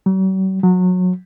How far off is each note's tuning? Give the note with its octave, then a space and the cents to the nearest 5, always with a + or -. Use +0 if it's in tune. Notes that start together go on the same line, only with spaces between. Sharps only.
F#3 +45
F#3 -25